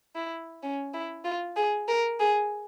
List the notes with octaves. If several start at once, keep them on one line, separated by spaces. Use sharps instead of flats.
E4
C#4
E4
F4
G#4
A#4
G#4